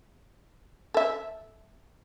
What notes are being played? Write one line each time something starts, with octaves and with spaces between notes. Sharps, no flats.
A4 E5